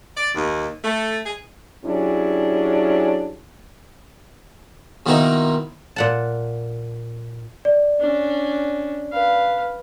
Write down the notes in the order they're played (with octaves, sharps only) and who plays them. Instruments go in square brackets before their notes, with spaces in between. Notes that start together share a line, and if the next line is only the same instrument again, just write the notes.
[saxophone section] D5
D#2
A3
G#4
[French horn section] F#3 C#4 D4 E4 G4 G#4
[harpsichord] B2 D#3 A#3 C4 D#4 E4
[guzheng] A#2 F#5 A5
[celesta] D5
[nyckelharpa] C#4 D4
B4 F5